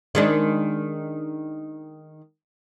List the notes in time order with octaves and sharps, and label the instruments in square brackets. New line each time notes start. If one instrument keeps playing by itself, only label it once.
[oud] D#3 G#3 D4